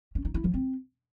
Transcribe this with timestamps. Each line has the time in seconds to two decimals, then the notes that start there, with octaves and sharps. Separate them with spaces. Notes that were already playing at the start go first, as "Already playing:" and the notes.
0.15 C#4
0.25 D#4
0.34 E4
0.44 F3
0.54 C4